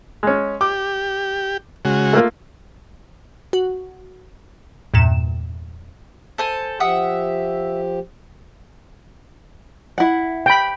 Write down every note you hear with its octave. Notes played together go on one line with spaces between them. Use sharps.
G#3 C#4
G4 D6
C#3 G#3 F#4
A3 A#3 F4
F#4
E2 G2 A#2 E7
A4 C5 G#5
F3 G4 E5 F#5 D#6
E4 F#5
G5 B5